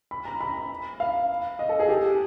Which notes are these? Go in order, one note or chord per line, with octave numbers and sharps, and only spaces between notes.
B5
A#5
B5
F5
D#5
A4
G#4
G4